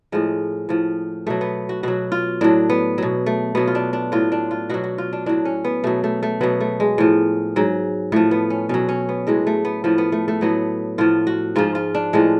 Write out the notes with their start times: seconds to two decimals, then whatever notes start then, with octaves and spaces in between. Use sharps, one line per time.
0.12 A2 F3 G#3
0.69 A2 F3
1.27 B2 F#3 A3
1.41 B3
1.69 F#4
1.83 B2 F#3 F#4
2.12 F4
2.41 A2 F#3 D4
2.70 B3
2.98 B2 F#3
3.26 A3
3.55 B2 F#3 B3
3.67 F4
3.75 D4
3.93 D4
4.12 A2 F#3 F4
4.32 D4
4.51 F4
4.70 B2 F#3 F#4
4.84 F#4
4.98 F4
5.13 D4
5.26 A2 F#3 D4
5.45 C#4
5.65 B3
5.84 B2 F#3 A3
6.04 A3
6.23 A3
6.41 B2 F#3 B3
6.60 A3
6.80 G#3
6.98 A2 F3
7.56 G#2 F#3
8.12 A2 F3 A3
8.31 B3
8.50 C#4
8.69 B2 F#3 C#4
8.89 C#4
9.09 B3
9.27 A2 F#3 G#3
9.47 A3
9.65 B3
9.84 A2 F3 B3
9.98 B3
10.12 A3
10.28 A3
10.41 A2 F#3 B3
10.98 A2 F3 F4
11.27 F#4
11.56 G#2 F3 F4
11.75 F4
11.95 D4
12.13 A2 F3 G#3